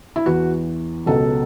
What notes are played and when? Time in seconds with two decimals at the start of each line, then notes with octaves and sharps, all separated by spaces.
0.16 E4
0.26 E2 E3 F#4
1.06 C#2 B2 F#3 A4